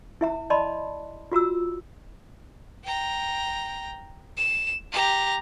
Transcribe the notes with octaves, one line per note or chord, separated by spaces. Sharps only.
E4 E5 A#5
D5 D#5 A5 B5 C6
F4 F#4 A#5 E6
G5 A#5
E7
G4 A#5